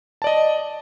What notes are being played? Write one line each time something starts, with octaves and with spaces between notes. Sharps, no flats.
D5 D#5 A5